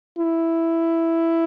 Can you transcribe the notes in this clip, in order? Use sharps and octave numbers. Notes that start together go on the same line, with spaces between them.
E4